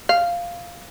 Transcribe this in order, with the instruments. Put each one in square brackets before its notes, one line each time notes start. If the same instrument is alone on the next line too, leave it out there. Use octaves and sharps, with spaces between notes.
[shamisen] F5